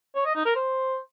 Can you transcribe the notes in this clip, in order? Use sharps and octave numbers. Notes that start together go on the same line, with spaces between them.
C#5
D#5
D#4
A#4
C5